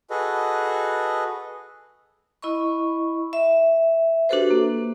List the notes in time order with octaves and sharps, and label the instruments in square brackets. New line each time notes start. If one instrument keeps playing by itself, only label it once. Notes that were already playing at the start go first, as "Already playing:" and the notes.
[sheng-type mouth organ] F#4 G#4 A4 B4 D#5
[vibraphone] E4 D#5 B5 C#6
E5
D4 F#4 G4 A4 B4 C5
A#3